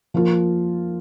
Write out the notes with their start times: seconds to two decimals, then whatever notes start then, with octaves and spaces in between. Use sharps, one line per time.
0.14 F3 A#3 F4